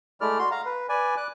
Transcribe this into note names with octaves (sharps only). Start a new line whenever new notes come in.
G#3 A3 E4 D5 F6
F#4 C6
F5 A#5
B4
B4 D5 G#5
D6 F#6